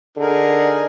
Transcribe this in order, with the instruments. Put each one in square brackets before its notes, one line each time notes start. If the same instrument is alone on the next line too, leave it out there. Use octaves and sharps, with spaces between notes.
[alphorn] D3 [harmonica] D#4 G#4 A#4